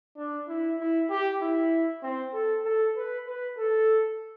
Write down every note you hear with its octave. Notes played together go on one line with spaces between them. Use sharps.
D4
E4
E4
G4
E4
C4
A4
A4
B4
B4
A4